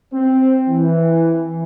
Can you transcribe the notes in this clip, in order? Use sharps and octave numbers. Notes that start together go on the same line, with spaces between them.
C4
E3